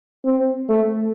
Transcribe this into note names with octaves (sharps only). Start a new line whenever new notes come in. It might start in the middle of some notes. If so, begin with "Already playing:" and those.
C4
A3